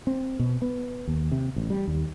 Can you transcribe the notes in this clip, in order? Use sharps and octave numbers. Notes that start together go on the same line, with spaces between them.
C4
B2
B3
D#2
C3
A1
G3
D#2